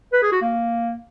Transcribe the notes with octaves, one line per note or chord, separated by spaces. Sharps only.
B4
G#4
F#4
A#3